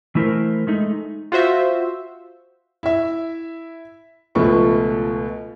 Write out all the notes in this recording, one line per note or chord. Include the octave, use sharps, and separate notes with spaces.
E3 A3 E4 A4 A#4 C5
G#3 A3 D#4
F4 F#4 C5 E5
E4 E5
C#2 B2 F3 A3 B4 C#6